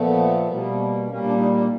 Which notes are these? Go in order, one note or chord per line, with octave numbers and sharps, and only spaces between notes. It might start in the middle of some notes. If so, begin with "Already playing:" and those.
Already playing: A#2 F3 A3 B3
B2 G3 A#3
A#2 G3 A#3 C#4
D4
D#4
D4